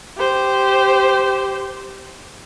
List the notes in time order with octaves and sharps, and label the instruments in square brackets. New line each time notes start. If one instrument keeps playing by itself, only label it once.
[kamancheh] G4 C5